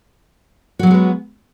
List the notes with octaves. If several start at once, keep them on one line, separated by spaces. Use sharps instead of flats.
F#3 G#3 B3 F#4 B4